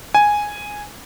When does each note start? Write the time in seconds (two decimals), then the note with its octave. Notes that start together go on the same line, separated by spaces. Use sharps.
0.15 G#5